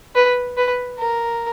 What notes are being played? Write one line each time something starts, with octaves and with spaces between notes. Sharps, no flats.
B4
B4
A#4